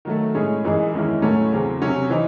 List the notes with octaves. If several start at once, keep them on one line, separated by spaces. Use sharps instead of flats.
D#3 F#3 A3
A2 G#3 C#4 G#4
F#2 E3 G#3 D#4 G#4
E2 D#3 G#3 C#4 E4
A2 F#3 A3 C#4
E2 C#3 F#3 C4
C3 F#3 C#4
E3 C4 D#4